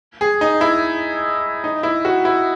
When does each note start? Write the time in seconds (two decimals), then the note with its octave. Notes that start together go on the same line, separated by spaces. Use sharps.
0.21 G#4
0.41 D#4
0.61 E4
1.64 D#4
1.83 E4
2.05 F#4
2.25 E4